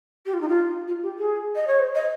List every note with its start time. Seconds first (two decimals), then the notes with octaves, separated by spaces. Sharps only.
0.25 G4
0.33 F4
0.40 D#4
0.48 F4
0.87 F4
1.02 G4
1.18 G#4
1.55 D#5
1.67 C#5
1.79 C5
1.94 D#5